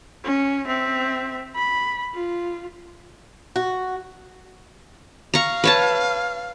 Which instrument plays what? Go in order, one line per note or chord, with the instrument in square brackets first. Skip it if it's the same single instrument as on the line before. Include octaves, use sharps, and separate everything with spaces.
[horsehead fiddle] C#4
C4 E5
B5
F4
[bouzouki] F#4
[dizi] F5 [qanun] A#5 C#6
[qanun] B4 C#5 A5